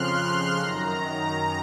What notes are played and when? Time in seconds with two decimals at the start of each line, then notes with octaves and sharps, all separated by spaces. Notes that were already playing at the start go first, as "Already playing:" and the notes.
Already playing: F2 C#3 F3 C6 F6 F#6
0.59 F#2 D#3 A#5